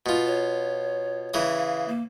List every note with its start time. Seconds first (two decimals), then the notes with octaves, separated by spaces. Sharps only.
0.06 B2 F4
0.27 C#5
1.34 C#3 E3 D#6
1.58 F5
1.88 A#3